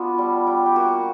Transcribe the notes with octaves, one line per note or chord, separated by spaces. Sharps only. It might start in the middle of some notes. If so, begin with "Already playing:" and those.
Already playing: B3 D4 F4 F#4
G3
G3
G4
A#3 F#4